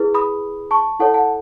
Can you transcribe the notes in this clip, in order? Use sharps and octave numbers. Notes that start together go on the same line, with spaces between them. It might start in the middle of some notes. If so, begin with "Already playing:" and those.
Already playing: E4 G#4 B4
B5 D#6
A5 C#6
E4 A4 C#5 F#5 A5
F#5 A5